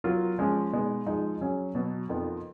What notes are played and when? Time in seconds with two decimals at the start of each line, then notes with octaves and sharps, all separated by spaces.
0.04 F#3 B3 F4 A#4
0.38 F3 G#3 C#4
0.73 B2 G#3 B3 D#4
1.06 G#2 F3 G#3 D#4
1.41 F#3 C#4 G#4 C#5
1.75 B2 F#3 B3
2.09 F2 F3 B3 D#4 A#4